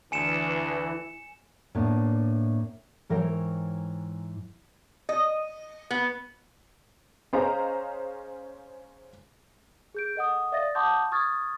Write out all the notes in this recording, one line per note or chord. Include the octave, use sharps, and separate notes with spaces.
D2 E3 G#5 C#7 E7
A2 A#3 B3 D4
G#2 E3 A#4 C#5 G5
D#5
B3
C#4 G#4 C5 D#5 F5 A#5
G#4 G6 D7
A4 D#5 F#5 D#6
D5 E5 F5 D#6 A6 A#6
F#5 A5 C6 D6 D#6 G6
C#6 D#6 F6 G#6 A6